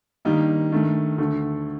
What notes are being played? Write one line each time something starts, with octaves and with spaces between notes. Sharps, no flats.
G2 D#3 G3 A#3 D#4
G2 D#3 A3
D2 D3 A3